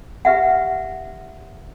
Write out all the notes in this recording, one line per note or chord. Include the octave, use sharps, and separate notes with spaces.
G4 B4 E5 F#5